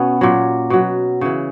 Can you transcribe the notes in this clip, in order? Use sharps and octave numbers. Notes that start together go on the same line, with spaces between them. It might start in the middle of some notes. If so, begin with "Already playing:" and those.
Already playing: B2 B3 C#4
A#2 F#3
B2 F#3
C#3 E3